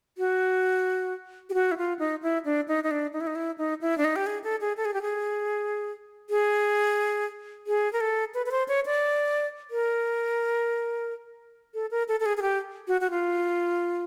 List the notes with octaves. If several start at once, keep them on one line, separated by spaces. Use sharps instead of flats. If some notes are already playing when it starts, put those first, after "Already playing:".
F#4
G4
F#4
E4
F4
D#4
E4
D4
D#4
D#4
D4
D#4
E4
D#4
E4
D#4
E4
D4
D#4
G4
G#4
A4
G#4
A4
G#4
G4
G#4
G#4
G#4
A#4
A4
B4
B4
C5
C#5
D5
A#4
A4
A#4
A4
A4
G#4
G#4
G4
F#4
F#4
F4